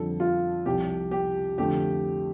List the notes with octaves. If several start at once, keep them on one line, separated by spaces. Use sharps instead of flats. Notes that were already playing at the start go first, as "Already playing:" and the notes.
Already playing: F2 D3 G3 A4
F4
C2 C3 F3 G4
G4
F2 D3 A3 G4